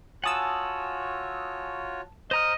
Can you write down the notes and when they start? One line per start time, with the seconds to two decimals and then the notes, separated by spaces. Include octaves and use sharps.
0.24 F4 F#4 C#5 F#5 G#5 A5 D#6 E6
2.31 C5 D#5 A#5 F6